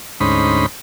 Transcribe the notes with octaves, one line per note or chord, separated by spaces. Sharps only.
D2 G#2 C#4 D#4 C5 B5